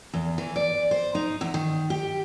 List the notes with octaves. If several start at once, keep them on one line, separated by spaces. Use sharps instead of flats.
E2
E3
D5
C5
D#4
E2
D#3
G4